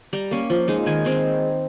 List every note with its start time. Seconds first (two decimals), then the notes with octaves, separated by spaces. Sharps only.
0.13 G3 A#5
0.31 A#3 C#4
0.50 F3
0.68 G#3 D#4
0.86 D#3 G#5
1.05 G#3 C4 D#4